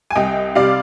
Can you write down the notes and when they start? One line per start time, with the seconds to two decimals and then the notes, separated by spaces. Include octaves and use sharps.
0.11 G#5
0.15 C2 D#5 G5
0.55 C3 G3 D5 F5